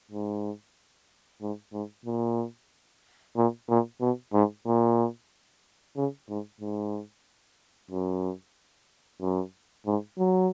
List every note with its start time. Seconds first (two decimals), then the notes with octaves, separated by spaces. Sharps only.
0.12 G#2
1.42 G#2
1.73 G#2
2.06 A#2
3.37 A#2
3.69 A#2
4.01 B2
4.33 G#2
4.67 A#2
5.97 C#3
6.29 G#2
6.61 G#2
7.91 F#2
9.22 F#2
9.87 G#2
10.19 F#3